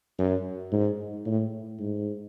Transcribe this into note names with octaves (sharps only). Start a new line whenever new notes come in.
F#2
G#2
A2
G#2